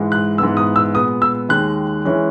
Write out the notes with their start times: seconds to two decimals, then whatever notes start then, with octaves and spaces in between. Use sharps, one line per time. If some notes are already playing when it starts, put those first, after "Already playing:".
Already playing: G#2 E3 G#3
0.12 F#6
0.38 G#2 E3 B3 E6
0.57 D#6
0.76 E6
0.94 A#2 G#3 B3 D#6
1.22 E6
1.49 D#2 D#3 G#3 F#6
2.05 E3 G#3 C#4